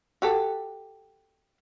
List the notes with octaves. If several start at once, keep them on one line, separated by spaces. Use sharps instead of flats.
F#4 G4 A4